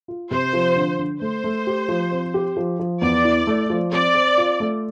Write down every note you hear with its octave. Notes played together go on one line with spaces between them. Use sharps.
F4
C3 C5
F3
D3
D3
A3 C5
A3
G4
F3
C4
G4
F3
F3
E2 D5
E4
A3
F3
C4 D5
C4
F4
A3